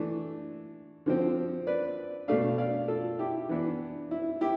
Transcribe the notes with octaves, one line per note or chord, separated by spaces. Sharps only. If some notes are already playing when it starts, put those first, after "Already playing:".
Already playing: E3 A3 D4
D3 F3 C4
B4 D5
B2 A3 D4 D5 F5
D5 F5
F4 A4
E4 G4
E3 B3 D4
E4
E4 G4